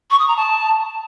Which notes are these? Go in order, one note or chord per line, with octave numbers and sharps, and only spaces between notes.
C#6
D#6
A#5
A5